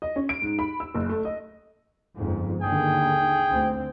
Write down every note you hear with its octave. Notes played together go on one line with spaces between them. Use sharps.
D#5
C#4
D7
G#2
B5
E6
F#1
A3
D#5
G1 F2 G#2
D#2 D3 D#3 G#4 G5
D2 C4